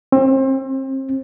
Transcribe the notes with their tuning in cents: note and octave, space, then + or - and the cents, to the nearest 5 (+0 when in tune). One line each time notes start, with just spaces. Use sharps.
C4 +35